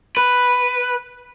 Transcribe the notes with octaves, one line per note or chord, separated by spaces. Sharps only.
B4